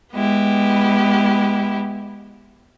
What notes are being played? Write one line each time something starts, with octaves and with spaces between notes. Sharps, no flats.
G#3 B3 E4 G4